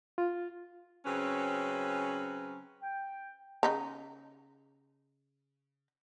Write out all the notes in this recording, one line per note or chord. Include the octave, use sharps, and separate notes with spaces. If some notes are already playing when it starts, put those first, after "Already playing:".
F4
C#3 F#3 C4 C#4 B4
G5
C#3 D#4 A#5